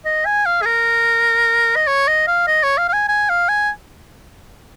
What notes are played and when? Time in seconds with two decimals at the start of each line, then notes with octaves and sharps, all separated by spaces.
0.05 D#5
0.26 G#5
0.46 F5
0.62 G#4
0.66 A#4
1.76 D#5
1.87 C#5
2.07 D#5
2.27 F5
2.47 D#5
2.63 C#5
2.78 F5
2.88 F5
2.93 G#5
3.08 G#5
3.29 F5
3.49 G#5